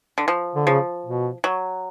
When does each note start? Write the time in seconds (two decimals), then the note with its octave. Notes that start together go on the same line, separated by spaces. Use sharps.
0.18 D3
0.28 F3
0.55 D3
0.67 C#3 F3
1.06 B2
1.44 F#3